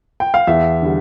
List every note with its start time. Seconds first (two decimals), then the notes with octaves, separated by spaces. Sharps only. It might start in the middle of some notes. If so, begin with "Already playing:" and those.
0.20 G5
0.34 F5
0.47 E2 E5
0.82 D3 G3